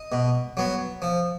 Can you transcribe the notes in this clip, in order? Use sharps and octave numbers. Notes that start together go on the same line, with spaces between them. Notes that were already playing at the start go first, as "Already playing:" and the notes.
Already playing: D#5
B2
F#3 B3
F3